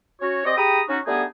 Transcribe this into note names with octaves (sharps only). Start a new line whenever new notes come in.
C#4 F#4 C#5
C3 C4 D5 D#5
G4 G#4 G5 A#5 B5 D#6
C#4 D#4 F#4
G3 A3 B3 D4 D#4 G#4